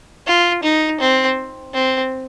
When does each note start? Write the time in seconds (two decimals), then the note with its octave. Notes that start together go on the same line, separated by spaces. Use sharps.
0.27 F4
0.64 D#4
1.01 C4
1.74 C4